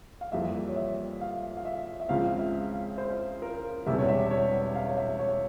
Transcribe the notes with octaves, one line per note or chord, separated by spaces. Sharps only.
F5
F2 E3 G3 A#3 E5
C#5
E5
F5
F5
E5
E5
C#2 C#3 F3 C4 F5
E5
C5
A#4
E1 E2 C3 G3 E5
C#5
E5
C#5
F5
C#5
E5
C#5